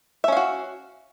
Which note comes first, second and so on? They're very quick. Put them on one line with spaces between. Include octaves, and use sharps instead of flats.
E5 C#4 F5 F#4